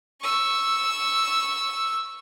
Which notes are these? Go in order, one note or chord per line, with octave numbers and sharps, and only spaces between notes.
C#6 E6